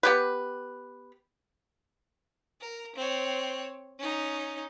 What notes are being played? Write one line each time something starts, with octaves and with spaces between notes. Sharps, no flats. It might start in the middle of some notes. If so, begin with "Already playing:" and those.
B3 G4 B4
A#4
C4 C#5
C#4 D#4